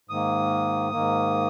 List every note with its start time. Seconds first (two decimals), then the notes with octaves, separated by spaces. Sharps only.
0.09 G#2 D#3 A#3 D#6
0.92 G#2 D#3 A#3